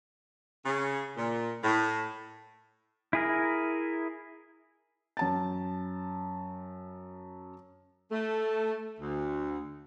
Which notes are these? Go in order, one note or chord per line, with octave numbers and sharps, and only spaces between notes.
C#3
A#2
A2
E4 G#4 A#4
F#2 A5 A6
A3
D2